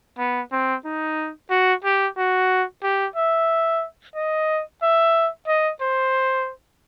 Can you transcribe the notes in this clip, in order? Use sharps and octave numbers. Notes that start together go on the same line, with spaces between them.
B3
C4
D#4
F#4
G4
F#4
G4
E5
D#5
E5
D#5
C5